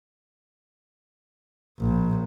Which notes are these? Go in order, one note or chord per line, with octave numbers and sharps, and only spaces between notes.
A#1